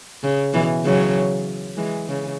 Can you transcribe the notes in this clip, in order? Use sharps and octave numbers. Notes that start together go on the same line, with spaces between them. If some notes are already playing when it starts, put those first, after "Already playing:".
C#3
B2 E3
C#3 F#3
E3 G#3
C#3